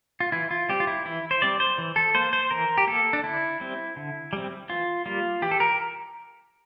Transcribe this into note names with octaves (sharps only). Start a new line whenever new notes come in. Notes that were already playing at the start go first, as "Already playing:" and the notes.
F4
E3 E4
F4
G3 C4 G4
F4
E4
E3 E4
C5
G3 C4 D5
C5
E3
A4
A#3 C5
C5
E3 A#4
G4
A#3 A4
D4
D3 E4
G3 C4
D3
G3 C4
E3 F4
G3 A#3 F4
E3 G4
A4
A#4